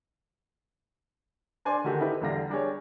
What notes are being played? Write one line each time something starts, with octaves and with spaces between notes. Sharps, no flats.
D4 C5 D5 G#5 C6
D3 D#3 A3 F#4 G4 A4
D#4 E4 G4 A4 B4
E2 D3 G3 F5 A#6
G3 D4 G#4 C#5